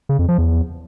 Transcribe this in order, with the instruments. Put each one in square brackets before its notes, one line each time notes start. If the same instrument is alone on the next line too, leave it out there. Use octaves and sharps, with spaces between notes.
[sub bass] C#3
F2
F3
E2